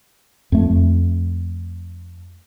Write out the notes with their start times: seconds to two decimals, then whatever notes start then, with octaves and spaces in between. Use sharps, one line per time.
0.52 F2 A3